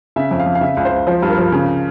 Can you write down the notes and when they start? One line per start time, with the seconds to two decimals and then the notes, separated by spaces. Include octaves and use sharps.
0.16 C#3 E5
0.31 F2
0.39 F5
0.46 F2
0.55 F5
0.61 C#3 E5
0.77 C#2
0.85 C5
0.91 C#2
1.07 F3 C5
1.22 G2
1.29 A#4
1.38 F3
1.52 C#3